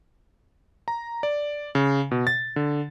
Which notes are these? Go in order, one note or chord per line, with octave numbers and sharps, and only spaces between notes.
A#5
D5
C#3
B2
A6
D3